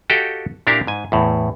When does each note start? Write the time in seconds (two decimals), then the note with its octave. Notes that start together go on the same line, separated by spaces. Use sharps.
0.10 F#4 G4 A4 D#5 F5 G5
0.67 A#2 D4 E4 G4 A#4 F5
0.87 G#2 G#5
1.12 E2 A2